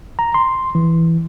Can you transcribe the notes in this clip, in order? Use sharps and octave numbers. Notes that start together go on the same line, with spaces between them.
A#5
C6
E3